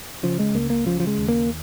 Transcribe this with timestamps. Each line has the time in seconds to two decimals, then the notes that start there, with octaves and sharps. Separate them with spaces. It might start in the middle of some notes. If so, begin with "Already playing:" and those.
0.23 C#3 F3
0.39 G#3
0.55 C#2 A#3
0.70 A#3
0.86 C#3 F3
1.00 F3
1.07 G#3
1.18 D#2
1.29 A#3